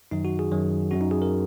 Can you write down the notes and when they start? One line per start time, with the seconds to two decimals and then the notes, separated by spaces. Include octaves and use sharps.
0.11 F#2 D#3 F#3 D#4
0.25 F#4
0.39 G#4
0.52 F#2 D#3 F#3
0.91 F#2 F#3 C#4 F#4
1.01 D#4
1.11 G#4
1.22 A#4